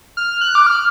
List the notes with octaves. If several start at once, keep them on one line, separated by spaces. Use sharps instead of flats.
F6
F#6
D6
F6